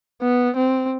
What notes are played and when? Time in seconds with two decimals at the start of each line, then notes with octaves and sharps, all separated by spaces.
0.22 B3
0.56 C4